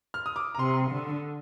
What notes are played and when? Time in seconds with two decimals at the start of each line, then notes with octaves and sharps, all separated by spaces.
0.14 F6
0.26 D#6
0.36 D6
0.55 A#5
0.59 C3 C6
0.91 D3